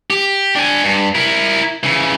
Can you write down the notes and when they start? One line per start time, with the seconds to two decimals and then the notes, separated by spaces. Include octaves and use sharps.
0.10 G4
0.56 D4 G#5
0.84 G2
1.15 E4 A#4
1.84 C#3 E3